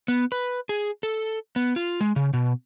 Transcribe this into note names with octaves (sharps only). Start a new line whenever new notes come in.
B3
B4
G#4
A4
B3
F4
G#3
C#3
B2